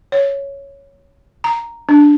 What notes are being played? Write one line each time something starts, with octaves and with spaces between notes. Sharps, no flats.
C#5
A#5
D4